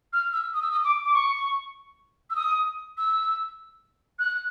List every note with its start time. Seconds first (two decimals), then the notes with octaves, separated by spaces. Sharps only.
0.13 F6
0.33 E6
0.54 D#6
0.62 E6
0.71 D#6
0.84 D6
1.05 D6
1.14 C#6
2.30 E6
2.36 D#6
2.97 E6
4.19 F#6